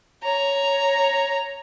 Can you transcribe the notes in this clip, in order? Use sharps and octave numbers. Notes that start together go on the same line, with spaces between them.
C#5 A#5